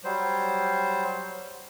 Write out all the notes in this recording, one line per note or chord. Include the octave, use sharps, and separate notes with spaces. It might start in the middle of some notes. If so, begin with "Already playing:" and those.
F#3 G3 C5